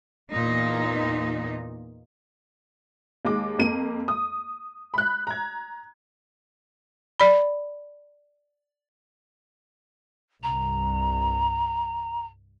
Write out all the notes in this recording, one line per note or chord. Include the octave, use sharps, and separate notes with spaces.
E2 A#2 A#3 D#4
D#2 G#3 D6
F2 A#3 D#7
D#6
B5 F#6
A#5 G#6
D5 B5
C2 G2 A#5